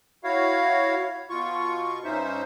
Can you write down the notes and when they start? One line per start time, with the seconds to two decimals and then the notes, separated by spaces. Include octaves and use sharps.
0.24 E4 F#4 C#5 F5
1.30 B2 F4 C#6
2.05 G2 C#4 D#4 C5 E5